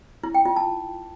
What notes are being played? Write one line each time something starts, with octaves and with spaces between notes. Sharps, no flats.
E4
G5
F4
A5